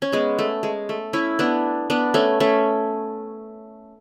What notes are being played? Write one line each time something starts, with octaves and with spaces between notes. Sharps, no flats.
C#4
G#3 B3
A3
G#3
A3
C#4 E4
B3 D4
B3 D4
A3 C#4
A3 C#4